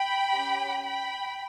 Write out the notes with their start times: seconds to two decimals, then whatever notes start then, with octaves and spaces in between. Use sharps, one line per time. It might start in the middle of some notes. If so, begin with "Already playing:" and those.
Already playing: G5 B5
0.31 C#4 G4
0.84 G5 B5